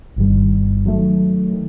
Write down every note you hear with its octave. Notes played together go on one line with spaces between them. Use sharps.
G1 G2 D#3 G3
D#3 F#3 A3
D#3